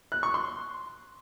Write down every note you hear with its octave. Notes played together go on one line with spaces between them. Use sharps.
F#6
C#6
C6